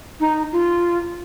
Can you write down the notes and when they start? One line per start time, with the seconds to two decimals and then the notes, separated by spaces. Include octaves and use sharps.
0.20 D#4
0.52 F4